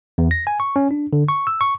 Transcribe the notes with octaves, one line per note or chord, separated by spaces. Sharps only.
E2
A#6
G#5
C#6
C#4
D4
D3
C#6
E6
C#6